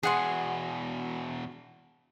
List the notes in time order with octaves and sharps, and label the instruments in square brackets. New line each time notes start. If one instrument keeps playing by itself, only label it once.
[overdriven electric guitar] E2 B2 [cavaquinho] G#4 F#5 C6